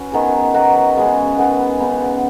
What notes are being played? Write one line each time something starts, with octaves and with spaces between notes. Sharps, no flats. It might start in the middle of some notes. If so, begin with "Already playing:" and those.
Already playing: C#4 F#4 B4
D#3 B3 G#4
D#3 F#3 B3 F#4
C#3 G#3 B3 G#4
D#3 B3 G#4 B4
C#3 B3 D#4